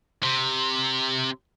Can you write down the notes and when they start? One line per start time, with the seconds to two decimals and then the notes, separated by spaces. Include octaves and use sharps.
0.23 C3